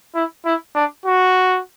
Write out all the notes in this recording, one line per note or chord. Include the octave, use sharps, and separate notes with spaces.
E4
E4
D4
F#4